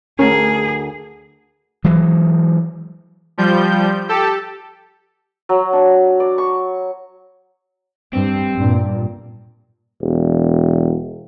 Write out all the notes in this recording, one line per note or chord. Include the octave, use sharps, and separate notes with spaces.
D2 C#4 G#4 A#4
E3 F#3 G#3
F3 G3 G6
G4 A4
F#3
D4
D5
C#6
G2 C4
G2 A#2
E1